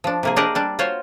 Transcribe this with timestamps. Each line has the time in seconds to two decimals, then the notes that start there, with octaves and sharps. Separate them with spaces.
0.04 F3 D4
0.23 C3 A#3 G#4
0.36 D4 G4 G#4 A#4 D5 D#5
0.55 G3 D4
0.79 F4 F#4 C5 C#5